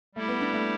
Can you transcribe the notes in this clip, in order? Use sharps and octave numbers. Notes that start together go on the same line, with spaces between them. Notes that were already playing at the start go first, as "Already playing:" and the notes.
G3 A3 E4 G4
B3
D4
A3